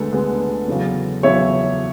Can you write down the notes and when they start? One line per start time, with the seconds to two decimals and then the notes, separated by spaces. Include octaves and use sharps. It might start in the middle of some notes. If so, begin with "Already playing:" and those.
Already playing: D2 D3 G#3 B3 A4
0.13 D2 D3 G#3 B3
0.68 E2 C#3 F#3
1.23 E2 C#3 F#3 C#5 E5